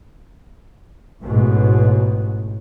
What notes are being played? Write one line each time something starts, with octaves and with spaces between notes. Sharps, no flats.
A1 G#2 B2